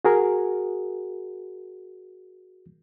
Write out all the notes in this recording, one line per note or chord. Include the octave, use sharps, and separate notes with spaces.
F#4 G#4 A#4